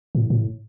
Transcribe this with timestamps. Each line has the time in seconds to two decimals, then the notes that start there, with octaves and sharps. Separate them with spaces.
0.15 A2
0.30 A2